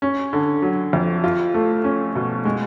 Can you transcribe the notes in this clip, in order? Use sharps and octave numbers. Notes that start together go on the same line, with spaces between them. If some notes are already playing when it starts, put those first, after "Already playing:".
C#4
D3
F#3
F2
F4
A3
C#4
B2
G#3